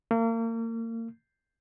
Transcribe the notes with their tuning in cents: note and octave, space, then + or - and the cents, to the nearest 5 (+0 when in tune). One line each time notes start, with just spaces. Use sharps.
A#3 -35